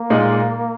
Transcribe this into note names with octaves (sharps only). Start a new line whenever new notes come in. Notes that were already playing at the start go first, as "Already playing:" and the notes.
Already playing: A#3
A#2 G#3 D#4